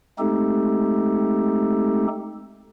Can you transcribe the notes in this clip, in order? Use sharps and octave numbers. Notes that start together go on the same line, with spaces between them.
G#3 A3 C4 D#4 G4 A4